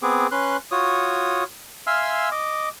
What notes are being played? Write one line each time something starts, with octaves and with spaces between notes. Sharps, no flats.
B3 C4 G#4 D6
C#4 B4 C6 F#6
F4 F#4 C#5 D#6
E5 F5 G#5 C6 E6 F6
D#5 D6